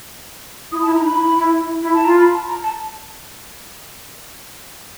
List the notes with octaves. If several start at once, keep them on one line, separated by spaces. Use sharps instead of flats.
E4 D#6
A5
E4
A#5
D#4
B5
E4
E4
E4
E4
A5
F4 A#5
B5
A5
A#5
A5